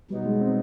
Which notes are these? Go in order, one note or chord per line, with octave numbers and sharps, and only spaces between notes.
B2 F#3 G3 B3 D#4
G#3
C4